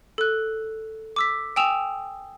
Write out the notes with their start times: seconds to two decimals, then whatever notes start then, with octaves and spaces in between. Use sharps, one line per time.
0.18 A4 F#6
1.16 D6 E6 B6
1.56 G5 G#5 D#6 E6 E7 F7